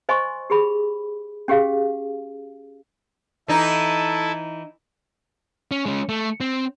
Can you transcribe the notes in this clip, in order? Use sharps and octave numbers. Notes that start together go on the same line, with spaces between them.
C5 D#5 G#5 C6 C#6
G4 G#4 B5
C#4 G4 G#4 F5
E3 D#4 E4 A4
C#4
G#3 C#4
A3
C4